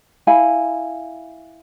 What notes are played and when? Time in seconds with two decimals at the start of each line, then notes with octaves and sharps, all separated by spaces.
0.27 E4 F5 G#5 B5